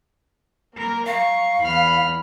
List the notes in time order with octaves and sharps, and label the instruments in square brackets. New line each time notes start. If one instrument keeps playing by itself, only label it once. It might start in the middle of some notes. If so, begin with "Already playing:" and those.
[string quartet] A#3 A#4
[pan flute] F5 [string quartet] A#5 C#6
[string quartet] E2 B5 F6